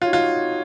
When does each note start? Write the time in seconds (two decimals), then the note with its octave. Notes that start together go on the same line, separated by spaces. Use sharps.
0.02 D#4 F4 F#4 C#5
0.13 F4